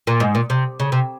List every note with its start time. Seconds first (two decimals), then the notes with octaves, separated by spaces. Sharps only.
0.07 A#2
0.20 G#2
0.35 A#2
0.50 C3
0.80 C#3
0.92 C3